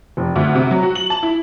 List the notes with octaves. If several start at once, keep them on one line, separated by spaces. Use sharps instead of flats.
F1
D2
C3
F#3
F#4
F#7
A5
E4